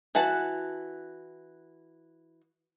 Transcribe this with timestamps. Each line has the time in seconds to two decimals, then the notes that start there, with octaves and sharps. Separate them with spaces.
0.15 E3 F#4 F#5 A5